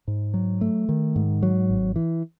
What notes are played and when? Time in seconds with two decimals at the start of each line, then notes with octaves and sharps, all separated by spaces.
0.08 G#2
0.34 F#3
0.61 A3
0.89 D#3
1.16 G#2
1.43 F#3
1.69 G#1
1.96 E3